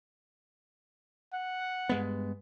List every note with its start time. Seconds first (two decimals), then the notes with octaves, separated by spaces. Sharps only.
1.34 F#5
1.89 G2 G#3 B3